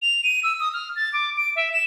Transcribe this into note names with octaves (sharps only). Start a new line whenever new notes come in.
F7
D#7
E6
D#6
F6
A6
D6
D7
E5
E7